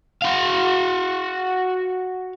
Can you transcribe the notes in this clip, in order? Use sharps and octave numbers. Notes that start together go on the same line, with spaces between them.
F#4 F5